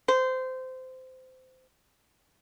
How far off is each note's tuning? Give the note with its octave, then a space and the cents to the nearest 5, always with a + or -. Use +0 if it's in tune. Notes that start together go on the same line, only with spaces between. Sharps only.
C5 -20